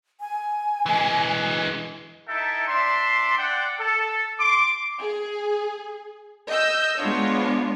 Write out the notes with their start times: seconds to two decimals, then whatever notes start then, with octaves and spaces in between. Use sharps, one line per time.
0.20 G#5
0.86 E3 G#3
2.28 D#4 E4 A4 E5 G5 A5
2.68 D4 D5 E5 C6
3.39 D5 F#5 G5
3.80 A4
4.40 C6 D6
4.99 G#4
6.48 D#5 E6 G6
6.98 G#3 B3 D4 F4 C#5